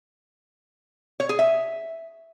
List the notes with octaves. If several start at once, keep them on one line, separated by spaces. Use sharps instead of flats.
C#5
G#4
E5